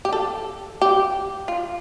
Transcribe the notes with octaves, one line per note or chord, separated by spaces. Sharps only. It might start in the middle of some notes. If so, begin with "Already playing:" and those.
G4
A4
G4
F4